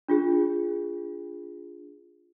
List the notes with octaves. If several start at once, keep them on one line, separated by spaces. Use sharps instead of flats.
D4 F4 G#4